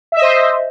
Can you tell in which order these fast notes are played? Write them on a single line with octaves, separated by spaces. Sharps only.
E5 D#5 C5